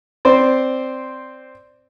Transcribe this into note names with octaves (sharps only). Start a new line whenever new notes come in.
C4 C5 D5